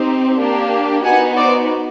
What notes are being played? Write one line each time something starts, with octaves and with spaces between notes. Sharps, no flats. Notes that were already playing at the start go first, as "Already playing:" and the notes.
Already playing: C4 D#4 G4
A#3 D4 G4
B3 D#4 F#4 F#5 G#5
C5 D5